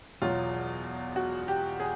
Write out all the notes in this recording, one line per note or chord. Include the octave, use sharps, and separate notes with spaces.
E2 B2 F#3 F4
F#4
G4
G#4